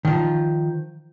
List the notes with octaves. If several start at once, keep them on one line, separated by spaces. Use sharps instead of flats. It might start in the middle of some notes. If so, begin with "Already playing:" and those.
D#3 F3